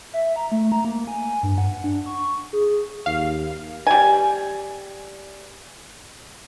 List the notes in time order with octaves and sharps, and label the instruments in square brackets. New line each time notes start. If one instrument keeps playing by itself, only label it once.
[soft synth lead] E5
A#5
A3
A#5
A#3
G#5
G2
F#5
D4
C#6
G#4
[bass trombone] D#2 [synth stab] F5
[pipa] G3 G#5